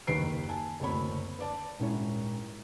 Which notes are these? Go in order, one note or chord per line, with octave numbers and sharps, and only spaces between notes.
F#1 D#2 D#3 B4 C7 D7
G#5 A5
F#1 D2 C4 C#5 B5
B4 D5 A5
D#1 G#2 C#4 E4 C#5